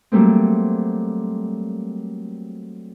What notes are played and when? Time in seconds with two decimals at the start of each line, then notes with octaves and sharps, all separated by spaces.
0.12 F#3 G3 A3 A#3 C4